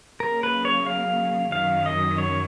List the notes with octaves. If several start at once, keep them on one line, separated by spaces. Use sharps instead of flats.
C#3 F#3 A#3 C#4 A#4
B4
C#5
F5
F#2 D#3 F#3 C#4 F5
D#5
C#5